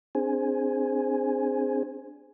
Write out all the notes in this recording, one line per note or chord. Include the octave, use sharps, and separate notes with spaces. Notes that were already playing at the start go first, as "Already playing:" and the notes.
C4 D4 G#4 C5 G#5